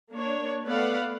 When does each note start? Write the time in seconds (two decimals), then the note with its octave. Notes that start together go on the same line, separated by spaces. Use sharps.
0.12 A#3 D4 C#5
0.66 A3 B3 B4 D5 F5 F#5